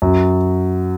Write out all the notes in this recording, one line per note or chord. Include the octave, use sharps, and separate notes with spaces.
F#2